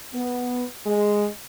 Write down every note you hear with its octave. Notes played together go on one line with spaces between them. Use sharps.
B3
G#3